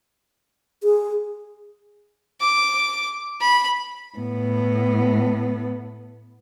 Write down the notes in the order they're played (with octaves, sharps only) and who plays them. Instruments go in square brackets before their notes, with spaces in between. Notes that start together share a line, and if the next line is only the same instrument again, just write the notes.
[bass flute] G#4
[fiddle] D6
B5
[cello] A2 B3